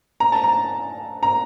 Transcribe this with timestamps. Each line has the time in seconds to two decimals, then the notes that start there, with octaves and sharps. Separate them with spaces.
0.20 A#5
0.32 A5
0.44 A#5
1.23 A#5